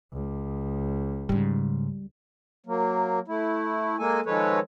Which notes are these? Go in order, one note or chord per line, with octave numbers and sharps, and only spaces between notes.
C#2
G#2 C#3 G3
F#3 A#3
A3 E4
G#3 A#3 A4 G#5
D#3 F3 G#3 A4 B4 C#5